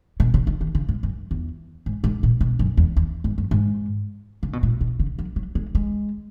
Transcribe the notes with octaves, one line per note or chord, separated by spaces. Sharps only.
B2
C#3
D#3
D#3
C#3
G#2
F#2
E2
G#2
G#2
A#2
B2
F#2
E2
E2
G#2
F#2
G#2
C#3
B2
A#2
B2
C#3
F#3
F#3
G#3
G#3